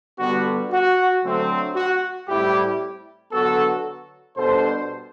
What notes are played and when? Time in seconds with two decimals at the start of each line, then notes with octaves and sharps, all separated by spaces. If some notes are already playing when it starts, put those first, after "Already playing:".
0.19 D3 G3 B3 F#4
0.71 F#4
1.23 D3 F#3 A3 C4
1.76 F#4
2.28 A2 G3 C4 E4 G4
3.32 D3 F#3 B3 F#4 A4
4.37 B2 G3 D4 A4 C5